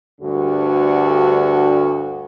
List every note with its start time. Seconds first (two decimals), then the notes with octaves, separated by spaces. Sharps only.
0.21 D2 G2 D3 G3 F#4